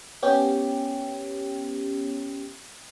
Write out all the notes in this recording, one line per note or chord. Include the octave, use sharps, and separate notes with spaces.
B3 C#4 G4